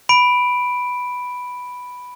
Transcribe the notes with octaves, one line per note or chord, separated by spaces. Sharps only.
B5 D7